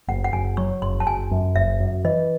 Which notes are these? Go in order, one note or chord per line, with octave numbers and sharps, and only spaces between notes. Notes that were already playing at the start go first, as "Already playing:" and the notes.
F#1 F#5
F#5
F#1 G#5
F#3 C#6
F#1 C6
A5
F#1 G#5
F#2
F#1 E5
F#2
E3 D#5